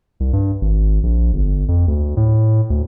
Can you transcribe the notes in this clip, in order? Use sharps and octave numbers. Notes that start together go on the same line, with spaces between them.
C2
G2
G#1
A#1
G1
F2
D2
A2
D2